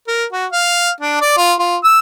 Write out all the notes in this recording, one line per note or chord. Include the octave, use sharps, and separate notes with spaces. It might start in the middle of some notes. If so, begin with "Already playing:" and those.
A#4
F#4
F5
D4
D5
F4
F4
E6